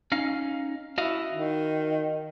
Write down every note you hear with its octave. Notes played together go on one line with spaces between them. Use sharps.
C#4 D#4 F5
E4 F#4 D#5 F5
D#3